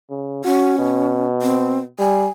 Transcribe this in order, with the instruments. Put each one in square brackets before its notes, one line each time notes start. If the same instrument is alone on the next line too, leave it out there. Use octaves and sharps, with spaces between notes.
[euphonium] C#3
[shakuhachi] C#4 [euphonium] F#4
[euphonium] B2
[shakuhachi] C4
[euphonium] G3 [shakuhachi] G#5